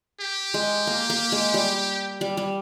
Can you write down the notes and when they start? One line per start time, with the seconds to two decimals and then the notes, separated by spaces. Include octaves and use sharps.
0.21 G4
0.54 G#3
0.87 A#3
1.10 A#3
1.32 G#3
1.54 G3
2.21 G3
2.37 G3